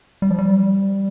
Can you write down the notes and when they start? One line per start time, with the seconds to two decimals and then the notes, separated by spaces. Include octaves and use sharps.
0.22 G3
0.30 F3
0.38 G3